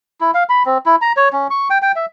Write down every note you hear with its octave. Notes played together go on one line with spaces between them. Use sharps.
E4
F5
B5
C4
E4
A#5
C#5
C#4
C#6
G5
G5
E5